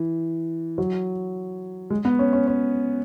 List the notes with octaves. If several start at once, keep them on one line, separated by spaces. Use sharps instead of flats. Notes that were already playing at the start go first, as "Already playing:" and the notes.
Already playing: E3
F#3
G#3
B3
C#4
C#4
C#4